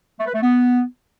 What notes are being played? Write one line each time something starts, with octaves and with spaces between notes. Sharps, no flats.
A3
B4
A3
B3